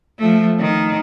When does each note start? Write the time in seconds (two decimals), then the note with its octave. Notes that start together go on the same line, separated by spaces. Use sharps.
0.18 F3 A3
0.60 D#3